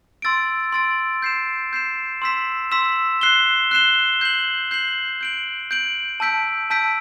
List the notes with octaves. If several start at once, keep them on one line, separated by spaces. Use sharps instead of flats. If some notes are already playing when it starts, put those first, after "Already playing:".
C6 E6 A6 D7
C6 E6 A6 D7
G6 C7 E7
G6 C7 E7
C6 E6 B6 E7
C6 E6 B6 E7
F#6 C7 E7 G7
F#6 C7 E7 G7
G6 C7 F#7
G6 C7 F#7
G6 D7 F#7
G6 D7 F#7
A5 E6 G6 B6 D7
A5 E6 G6 B6 D7